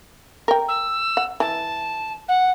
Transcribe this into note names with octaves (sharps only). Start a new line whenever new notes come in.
A#4 G5
E6
F#5
E3 A5
F#5